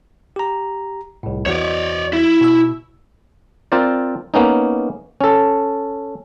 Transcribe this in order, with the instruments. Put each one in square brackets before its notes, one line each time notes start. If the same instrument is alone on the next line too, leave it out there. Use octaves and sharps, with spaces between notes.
[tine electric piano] G4 A#5
C2 A2
[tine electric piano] E2 E3 F#4 [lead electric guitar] C#5 D5
[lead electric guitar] E4
[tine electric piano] B2 E6
[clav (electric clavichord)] C4 F4 A#4 C5 D5
A#3 B3 C#4 D#4
C#4 A4